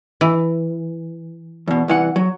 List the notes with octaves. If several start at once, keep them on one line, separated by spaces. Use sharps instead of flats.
E3
E2 B2
C2 E3 F#5
F#3